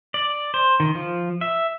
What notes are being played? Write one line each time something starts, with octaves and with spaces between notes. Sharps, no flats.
D5
C5
D#3
F3
E5